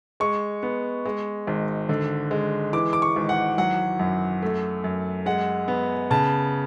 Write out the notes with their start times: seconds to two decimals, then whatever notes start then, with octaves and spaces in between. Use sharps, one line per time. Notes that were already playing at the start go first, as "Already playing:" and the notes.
0.20 G#3 C#6
0.63 B3
1.05 G#3
1.47 G#1
1.89 D3
2.31 G#3
2.73 E3 D6
2.93 D6
3.02 C#6
3.16 G#1
3.29 F#5
3.58 F#3 F#5
3.99 F#2
4.42 A3
4.84 F#2
5.26 G#3 F#5
5.68 B3
6.11 C#3 A5